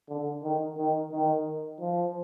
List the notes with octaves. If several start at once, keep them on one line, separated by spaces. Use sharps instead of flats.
D3
D#3
D#3
D#3
F3